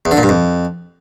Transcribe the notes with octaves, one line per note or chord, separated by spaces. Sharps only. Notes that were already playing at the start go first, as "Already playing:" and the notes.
E2
D3
A#2
G2
F2